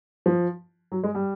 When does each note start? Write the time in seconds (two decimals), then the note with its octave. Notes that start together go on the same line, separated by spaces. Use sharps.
0.26 F3
0.92 F#3
1.03 G#3
1.15 G3